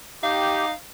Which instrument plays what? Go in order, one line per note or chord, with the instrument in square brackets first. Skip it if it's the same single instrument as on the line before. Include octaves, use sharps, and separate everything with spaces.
[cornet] D#4 [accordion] G4 [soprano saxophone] F5